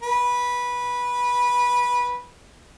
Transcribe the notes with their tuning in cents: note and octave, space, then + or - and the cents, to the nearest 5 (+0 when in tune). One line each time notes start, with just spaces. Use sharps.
B4 -15